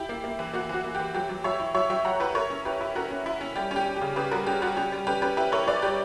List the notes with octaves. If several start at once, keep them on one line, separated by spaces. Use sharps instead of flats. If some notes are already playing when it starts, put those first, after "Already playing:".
Already playing: E4 G4
A#3
A#3
E3
A#3 F#4
E3 F#4
A#3
E3 G4
F#3 G4
F#3
F#3 C#5 E5
E4
F#3 C#5 E5
F#3 E5 G5
F#3 F#5 A#5
E4 G4 B4
E4 A#4 C#5
C#4
E4 G4 B4
E4
C#4 F#4 A#4
C#4
E4
C#4
G3 G4
C#4 G4
C#4
G4
C#3
C#3 G4 B4
G3 F#4 A#4
C#4 G4
G3 F#4
C#4 G4
G3
C#4 G4 B4
C#4 G4 B4
E4 G4 B4
E4 A#4 C#5
E4 B4 D5
G3 G4